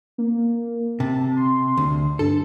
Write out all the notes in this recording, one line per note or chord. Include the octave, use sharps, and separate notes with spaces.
A#3
C3 A5
C6
D2
G2 A4